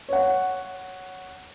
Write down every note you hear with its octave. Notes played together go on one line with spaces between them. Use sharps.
C#5 F#5